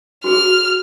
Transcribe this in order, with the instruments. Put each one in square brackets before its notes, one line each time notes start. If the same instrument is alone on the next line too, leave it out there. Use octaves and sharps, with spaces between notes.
[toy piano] F#4 G#4 A4 [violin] F6